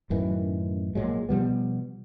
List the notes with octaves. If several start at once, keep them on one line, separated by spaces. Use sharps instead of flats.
A1 F#2 D#3 E3
A#1 A#2 F#3 G#3
B2 F3 G3 B3